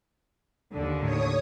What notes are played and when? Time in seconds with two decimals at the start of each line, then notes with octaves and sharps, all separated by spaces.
0.73 D#2 D3
1.03 A2 C#5 D#6